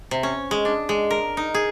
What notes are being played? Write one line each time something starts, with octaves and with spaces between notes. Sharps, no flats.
C3
C#4
G#3
D4
G#3
A#4
D#4
G#4